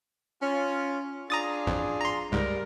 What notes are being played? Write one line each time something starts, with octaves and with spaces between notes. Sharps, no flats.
C#4 F4
D4 F4 G#4 A#5 D#6 A6
A1 F2
A#5 C6
C#2 G#2 G3 A#4